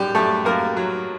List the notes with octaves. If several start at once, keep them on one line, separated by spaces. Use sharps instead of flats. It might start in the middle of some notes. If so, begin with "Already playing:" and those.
Already playing: F#2 G3 G4
F#2 A3 A4
F#2 A#3 A#4
F#3